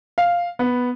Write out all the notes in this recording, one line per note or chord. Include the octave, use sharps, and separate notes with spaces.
F5
B3